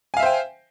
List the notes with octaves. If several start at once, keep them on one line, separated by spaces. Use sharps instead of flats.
C5 E5 F5 G5 G#5